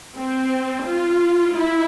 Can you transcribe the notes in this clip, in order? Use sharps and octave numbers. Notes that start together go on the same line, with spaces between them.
C4
F4
E4